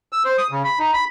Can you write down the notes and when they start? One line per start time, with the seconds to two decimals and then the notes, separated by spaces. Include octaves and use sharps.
0.13 E6
0.25 C5
0.38 D#6
0.52 C#3
0.64 B5
0.79 D#4
0.93 B5